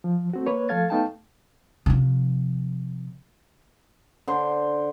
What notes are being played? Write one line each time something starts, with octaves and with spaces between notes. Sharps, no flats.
F3
A3 C4 F#4
A#3 B4 C#5
F3 A3 A4 F5 G#6 A6
A3 B3 D#4 F5 G5 A5
C3 F3
D3 C5